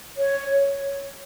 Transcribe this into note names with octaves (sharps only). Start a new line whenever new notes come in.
C#5